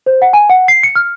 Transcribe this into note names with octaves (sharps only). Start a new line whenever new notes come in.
C5
F#5
G#5
F#5
C7
C#7
F6